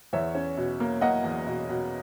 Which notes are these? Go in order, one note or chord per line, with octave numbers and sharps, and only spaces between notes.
E2 C#5 E5
C#4
B2
A#3
A#3 D#5 F#5
E2
B2
B2